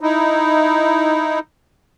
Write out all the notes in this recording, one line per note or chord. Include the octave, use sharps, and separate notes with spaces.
D#4 E4